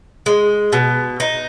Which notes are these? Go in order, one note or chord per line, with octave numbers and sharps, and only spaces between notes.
G#3
B2
D#4